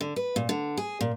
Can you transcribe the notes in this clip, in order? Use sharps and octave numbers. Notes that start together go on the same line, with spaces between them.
D3
B4
A#2
D3
G#4
A#2